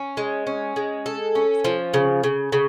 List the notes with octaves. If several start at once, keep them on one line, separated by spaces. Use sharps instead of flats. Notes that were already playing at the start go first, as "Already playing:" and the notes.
Already playing: C#4
G#3
C#4
G#3
A4
C#4
F3
C#3
C#3
C#3